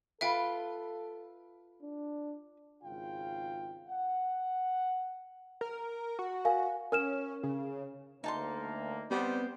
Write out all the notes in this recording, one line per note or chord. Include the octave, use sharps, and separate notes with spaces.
F4 A4 B4 E5 F5 G5
D4
G#1 C#3 F4 F5 G5
F#5
A#4
F#4
A#4 F5 G#5
C#4 A#4 F6 E7
C#3
D2 A#3 D#4 A5 C6
G3 B3 C4 C5